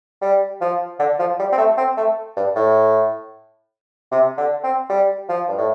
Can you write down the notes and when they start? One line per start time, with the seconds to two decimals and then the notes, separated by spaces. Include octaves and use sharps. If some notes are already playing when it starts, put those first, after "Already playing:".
0.21 G3
0.61 F3
0.99 D3
1.19 F3
1.39 G3
1.52 C4
1.58 A3
1.77 C4
1.97 A3
2.36 G2
2.55 A2
4.11 C3
4.37 D3
4.63 C4
4.89 G3
5.28 F3
5.48 G2
5.58 A2